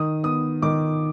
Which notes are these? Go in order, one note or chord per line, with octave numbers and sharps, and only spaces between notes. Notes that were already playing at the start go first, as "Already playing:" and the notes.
Already playing: D#3 D#6
B3 D#6
D#3 D6